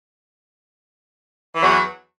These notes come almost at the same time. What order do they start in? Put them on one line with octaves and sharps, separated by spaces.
E3 F#3 E2